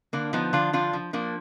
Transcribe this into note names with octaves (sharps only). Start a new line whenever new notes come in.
D3 A#3 D4
F3 B3 D#4
D3 D4 F4
F3 D4 F4
F3
F3 A#3 D4